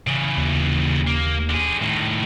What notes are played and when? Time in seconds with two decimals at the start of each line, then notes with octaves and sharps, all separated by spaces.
0.07 C#3 E3
0.37 D#2
1.07 A#3
1.50 D3 G#4
1.82 A2 D#3